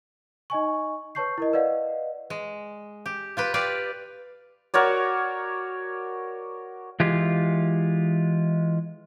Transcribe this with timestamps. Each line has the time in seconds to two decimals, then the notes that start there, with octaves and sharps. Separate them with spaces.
0.50 D#4 D#5 G#5 C#6
1.15 B4 C#5 A5 C#6 G6 C7
1.38 E4 A#4 D#5
1.53 B4 D5 D#5 F5 F#5
2.30 G#3
3.06 G4
3.37 F4 G4 B4
3.54 G4 B4 D5 F5
4.74 F#4 A#4 C#5 D5
7.00 E3 G#3 F4 G4